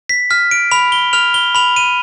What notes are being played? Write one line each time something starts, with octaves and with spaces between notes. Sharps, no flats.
B6
F6 B6
D7
B5 F7
G7
F6 F7
G7
B5 F7
D#7